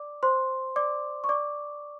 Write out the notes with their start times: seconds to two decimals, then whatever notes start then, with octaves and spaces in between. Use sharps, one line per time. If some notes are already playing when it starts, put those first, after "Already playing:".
Already playing: D5 D6
0.23 C5 C6
0.76 D5 D6
1.24 C#6
1.29 D5 D6